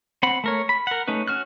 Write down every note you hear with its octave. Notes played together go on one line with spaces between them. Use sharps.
C4 F#5 B5
A3 A#4 C#5
B5
A#4 F#5
A3 C#4 D#4 B4
C#4 F#4 F6 F#6